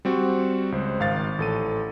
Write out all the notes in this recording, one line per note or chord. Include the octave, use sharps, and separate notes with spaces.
G3 C4 F#4
C#2 C5
G#1 F5 A6
A1 A4 D#7